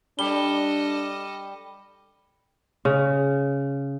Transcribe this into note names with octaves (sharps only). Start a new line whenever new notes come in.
G3 D4 A4 D#5 G7
C#3